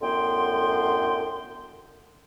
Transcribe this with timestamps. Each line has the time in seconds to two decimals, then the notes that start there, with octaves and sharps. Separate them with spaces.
0.01 F#2 A2 D3 B3 G5 C6